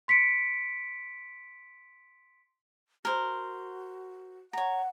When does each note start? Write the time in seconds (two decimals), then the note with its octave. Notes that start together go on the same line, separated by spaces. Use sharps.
0.08 C6 B6 C#7 D7
3.05 F#4 A#4 C5
4.53 C#5 F#5 A#5